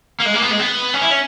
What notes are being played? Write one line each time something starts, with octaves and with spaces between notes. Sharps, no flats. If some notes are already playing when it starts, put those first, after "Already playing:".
A#3
G#3
A#3
B3
G#3
B3
C#4
E4
C#4